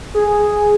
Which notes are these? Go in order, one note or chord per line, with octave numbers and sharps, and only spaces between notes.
G#4